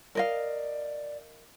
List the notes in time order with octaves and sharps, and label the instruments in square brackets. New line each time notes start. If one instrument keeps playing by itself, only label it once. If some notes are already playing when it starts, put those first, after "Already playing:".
[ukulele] A#4 D#5 F5 [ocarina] D5